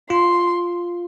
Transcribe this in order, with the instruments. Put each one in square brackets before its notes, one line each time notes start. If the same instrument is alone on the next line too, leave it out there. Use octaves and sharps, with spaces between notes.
[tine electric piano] F4 [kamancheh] C6